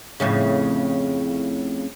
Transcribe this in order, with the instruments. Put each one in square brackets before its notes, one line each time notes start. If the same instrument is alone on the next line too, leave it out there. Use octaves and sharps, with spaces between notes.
[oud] F2 A2 C#3